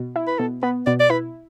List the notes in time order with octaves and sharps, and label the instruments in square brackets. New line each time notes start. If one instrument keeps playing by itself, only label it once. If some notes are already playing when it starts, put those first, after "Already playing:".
Already playing: [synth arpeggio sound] B2
E4
[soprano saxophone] B4
[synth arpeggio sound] B2 [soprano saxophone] A4
[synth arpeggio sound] B3 [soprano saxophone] B4
[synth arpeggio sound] B2 [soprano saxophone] D5
[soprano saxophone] D5
[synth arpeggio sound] E4 [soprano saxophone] B4